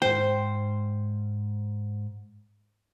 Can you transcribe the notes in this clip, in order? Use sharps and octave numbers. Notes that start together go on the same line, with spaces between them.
G#2 C5 G5